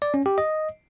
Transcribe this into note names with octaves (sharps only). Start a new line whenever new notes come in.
D5
C#4
G4
D#5